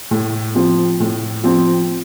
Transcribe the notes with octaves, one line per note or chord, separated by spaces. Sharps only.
A2
F3 C4
A2
F3 C4